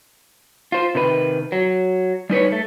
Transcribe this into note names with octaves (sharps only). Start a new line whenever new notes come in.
F4 C5
C3 D#3 B4
F#3
G3 D#4 B4 C#5
A3